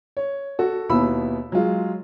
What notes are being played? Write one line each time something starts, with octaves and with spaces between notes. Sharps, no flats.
C#5
F#4 A4
D#2 B2 B3 E4 B5 E6
F#3 G#3 F4